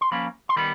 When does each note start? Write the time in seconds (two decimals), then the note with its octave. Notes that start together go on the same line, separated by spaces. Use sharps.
0.01 C6
0.11 F3 A#3 C#4 B5
0.49 C6
0.56 D#3 G3 B3 B5